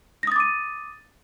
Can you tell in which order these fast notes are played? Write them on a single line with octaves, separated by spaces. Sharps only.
A#6 D#6 A6 D6 D#7